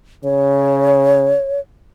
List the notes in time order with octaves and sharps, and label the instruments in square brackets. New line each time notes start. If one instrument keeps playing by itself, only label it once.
[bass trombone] C#3 [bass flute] C#5